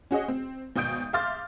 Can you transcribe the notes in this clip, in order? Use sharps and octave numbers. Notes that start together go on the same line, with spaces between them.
C#4 F#4 G#4 D#5
C4
G#1 B2 D#6 G6 D7
E5 F5 C6 D6 F6 A6